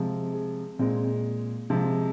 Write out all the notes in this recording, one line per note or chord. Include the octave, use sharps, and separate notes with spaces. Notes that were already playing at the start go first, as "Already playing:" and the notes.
Already playing: C3 F3 G#3
G#4
A#2 G#3 C4
C3 F3 G#3 C4